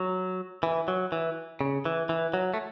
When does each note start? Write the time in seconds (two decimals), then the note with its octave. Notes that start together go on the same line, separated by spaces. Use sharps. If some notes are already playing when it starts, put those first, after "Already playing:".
Already playing: F#3
0.63 E3
0.88 F#3
1.12 E3
1.61 C#3
1.85 E3
2.09 E3
2.34 F#3
2.54 A3